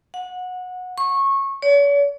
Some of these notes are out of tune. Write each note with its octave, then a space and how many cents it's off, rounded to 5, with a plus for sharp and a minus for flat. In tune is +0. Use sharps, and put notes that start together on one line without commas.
F#5 -20
C#6 -20
C#5 +45